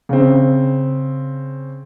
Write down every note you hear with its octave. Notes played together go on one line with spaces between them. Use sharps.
C#3 C4